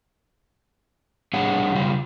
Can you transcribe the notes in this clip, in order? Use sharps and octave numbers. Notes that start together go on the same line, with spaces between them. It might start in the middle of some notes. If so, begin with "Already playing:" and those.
G3 D4 G#4 C#5 F#5
C#3 G3 F4